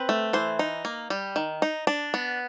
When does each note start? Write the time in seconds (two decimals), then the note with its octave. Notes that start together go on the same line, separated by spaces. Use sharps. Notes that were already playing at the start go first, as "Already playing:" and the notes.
Already playing: C4 B4
0.09 A3
0.33 E3 C5
0.59 D#4
0.85 A#3
1.10 G3
1.36 D#3
1.62 D#4
1.87 D4
2.14 B3